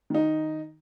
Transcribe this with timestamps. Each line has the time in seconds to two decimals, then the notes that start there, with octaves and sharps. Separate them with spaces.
0.10 D#3 D#4